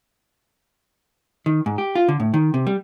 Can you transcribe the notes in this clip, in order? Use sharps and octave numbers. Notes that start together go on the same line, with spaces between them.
D#3
G#2
G4
F4
D3
A2
D#3
C3
G3